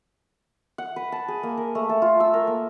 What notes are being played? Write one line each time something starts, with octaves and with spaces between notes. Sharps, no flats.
F#5
B4
A5
G#4
A#3
A#4
A3
A4
F4
E6
A#4
A#3